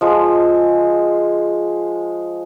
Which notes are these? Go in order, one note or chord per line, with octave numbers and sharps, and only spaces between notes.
F3 G#3